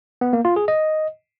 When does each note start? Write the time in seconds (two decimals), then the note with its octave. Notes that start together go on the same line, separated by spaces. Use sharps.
0.21 B3
0.33 A#3
0.45 F4
0.56 G#4
0.68 D#5